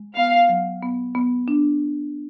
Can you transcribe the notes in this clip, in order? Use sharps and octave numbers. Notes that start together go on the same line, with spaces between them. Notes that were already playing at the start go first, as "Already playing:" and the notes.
Already playing: G#3
B3 F5
F#3
B3
B3
D4